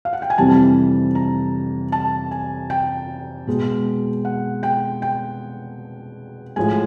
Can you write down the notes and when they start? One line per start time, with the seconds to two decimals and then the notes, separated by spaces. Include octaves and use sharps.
0.05 F5
0.13 F#5
0.22 G5
0.30 G#5
0.38 F2 C3 E3 G3 A5
1.15 A#5
1.92 A5
2.31 G#5
2.70 G5
3.47 B2 G#3
4.25 F#5
4.63 G5
5.02 G5
6.56 A2 F3 G#3 G#5